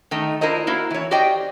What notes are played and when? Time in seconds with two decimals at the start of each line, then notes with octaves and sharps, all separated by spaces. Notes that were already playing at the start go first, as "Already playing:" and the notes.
0.11 D#3 A3 D#4
0.41 D4 E4 F4 A#4 C5 D#5
0.67 A#3 E4 F#4
0.90 E3 C#5
1.11 F#4 G4 C5 D5 D#5 G5